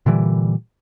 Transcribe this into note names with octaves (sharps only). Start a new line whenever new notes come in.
A#2 D3 E3 G3